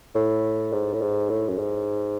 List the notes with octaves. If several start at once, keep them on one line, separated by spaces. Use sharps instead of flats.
A2
G#2
A2
G#2
A2
F#2
G#2